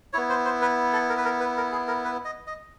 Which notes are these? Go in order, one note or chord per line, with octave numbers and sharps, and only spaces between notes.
B3 E4 C#5
C5
C5
B4
A4
A#4
B4
A#4
B4
A#4
G#4
A#4
B4
D#5
D#5